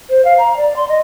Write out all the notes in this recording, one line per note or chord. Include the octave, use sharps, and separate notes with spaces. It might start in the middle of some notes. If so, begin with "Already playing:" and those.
C5
F5
A#5
D5
C6
D#5